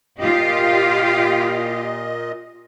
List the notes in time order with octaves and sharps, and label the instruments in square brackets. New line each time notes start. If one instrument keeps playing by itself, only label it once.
[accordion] A#2 D#5 [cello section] F4 G4